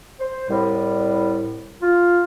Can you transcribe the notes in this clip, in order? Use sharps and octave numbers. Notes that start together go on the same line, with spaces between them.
C5
C2 A2 G3
F4